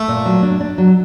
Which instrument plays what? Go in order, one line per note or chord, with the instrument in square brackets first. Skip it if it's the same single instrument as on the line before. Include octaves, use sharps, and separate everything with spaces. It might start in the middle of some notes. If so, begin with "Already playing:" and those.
Already playing: [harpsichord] A3
[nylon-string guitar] A#2
F#3
D4
D4
F#3